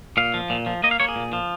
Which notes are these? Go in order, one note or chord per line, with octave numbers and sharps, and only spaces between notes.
A#2 F5
F3
A#2
F3
A#3 D#5
F5
A#3 C#5
G#4
A#2
F3